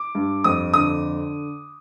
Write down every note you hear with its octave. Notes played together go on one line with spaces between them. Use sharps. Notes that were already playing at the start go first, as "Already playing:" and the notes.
Already playing: D6
G2
F2 D#6
D3 D#6